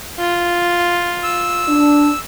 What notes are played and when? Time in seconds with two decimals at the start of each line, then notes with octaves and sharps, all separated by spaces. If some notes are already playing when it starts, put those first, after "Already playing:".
0.19 F4
1.23 E6
1.68 D4